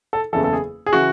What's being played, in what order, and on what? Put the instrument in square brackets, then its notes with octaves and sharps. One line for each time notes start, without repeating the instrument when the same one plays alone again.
[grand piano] A4
F#1 E2 C#3 E3 A4
A4
G#4
G#4
C#3 E3 F#4